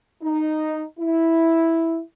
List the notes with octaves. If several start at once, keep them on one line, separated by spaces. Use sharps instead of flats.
D#4
E4